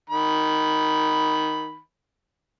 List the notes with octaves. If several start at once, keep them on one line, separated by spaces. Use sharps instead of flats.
D#3 B5